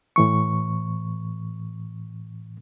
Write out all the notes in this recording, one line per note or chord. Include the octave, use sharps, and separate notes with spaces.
A2 E3 C#6